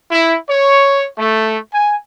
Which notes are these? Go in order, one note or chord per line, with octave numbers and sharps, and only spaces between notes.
E4
C#5
A3
G#5